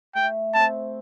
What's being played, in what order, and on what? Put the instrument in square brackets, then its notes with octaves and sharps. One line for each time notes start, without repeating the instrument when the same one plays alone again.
[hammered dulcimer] A3 [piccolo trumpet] G5
[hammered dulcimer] C4 [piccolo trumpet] A5